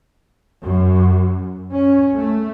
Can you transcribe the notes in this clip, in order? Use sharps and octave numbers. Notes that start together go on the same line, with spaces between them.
F#2
C#4
A3